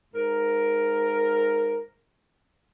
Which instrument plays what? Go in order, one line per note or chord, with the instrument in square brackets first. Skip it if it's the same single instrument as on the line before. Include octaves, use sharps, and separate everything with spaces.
[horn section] G#2 A#4